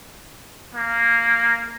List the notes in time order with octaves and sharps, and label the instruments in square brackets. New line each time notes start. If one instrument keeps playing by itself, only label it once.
[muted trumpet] A#3